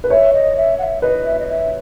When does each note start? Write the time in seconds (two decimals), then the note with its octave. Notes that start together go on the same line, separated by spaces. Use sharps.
0.04 B4
0.10 C#5 E5
0.33 D#5
0.56 E5
0.79 F#5
0.83 E5
1.02 B4 D#5
1.25 E5
1.39 D#5
1.48 E5